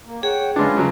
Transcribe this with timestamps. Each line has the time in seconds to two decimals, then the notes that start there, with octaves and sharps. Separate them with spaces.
0.05 A#3
0.23 G#4 C#5 F#5 G5
0.56 G#3 C#4 D4 F4 B4
0.77 C#3 F#3